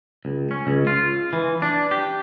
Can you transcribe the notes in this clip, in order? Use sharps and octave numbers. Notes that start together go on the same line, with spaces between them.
C#2
C#4
C#2
F4
E3
D4
G4